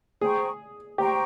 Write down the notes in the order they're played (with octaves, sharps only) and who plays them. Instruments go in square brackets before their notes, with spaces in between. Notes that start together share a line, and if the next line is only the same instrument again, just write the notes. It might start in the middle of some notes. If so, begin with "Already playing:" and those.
[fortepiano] G#4 [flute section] C5 G5 A#5 C#6
[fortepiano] G4 [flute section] C5 G5 A#5 C#6